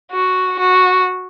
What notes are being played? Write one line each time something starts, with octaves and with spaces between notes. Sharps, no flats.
F#4
F#4